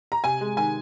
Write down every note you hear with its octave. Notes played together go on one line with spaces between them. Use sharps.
A#5
C3 G#5
G#3
D#3 G#5